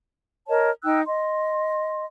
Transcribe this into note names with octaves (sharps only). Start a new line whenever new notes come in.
A#4 C#5 D#5 A5
D#4 G5 E6 F#6
D#5 C6